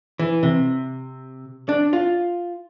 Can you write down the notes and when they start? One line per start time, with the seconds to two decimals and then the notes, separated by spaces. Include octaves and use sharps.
0.19 E3
0.43 C3
1.69 D4
1.93 F4